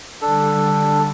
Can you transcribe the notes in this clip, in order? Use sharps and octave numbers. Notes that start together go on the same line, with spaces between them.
D3 G3 D4 A4